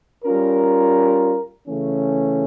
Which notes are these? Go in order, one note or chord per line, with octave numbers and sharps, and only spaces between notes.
G3 C#4 F4 A#4
C#3 E3 A3 C#4